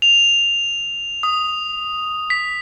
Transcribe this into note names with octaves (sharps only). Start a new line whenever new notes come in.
F7
D#6
B6